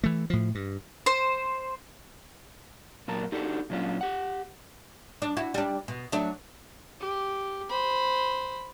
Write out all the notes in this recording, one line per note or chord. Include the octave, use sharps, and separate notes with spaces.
E3 A3
A2 F3
G2
C5
A#2 F#3 A#4 A5
D4 D#4 F#4 G4 A4
A#2 F#3 C#4 D4 F4
G4 F#5
D4
E4 F#4
G3 D4
B2
F#3 A3 D4
G4
C5 B5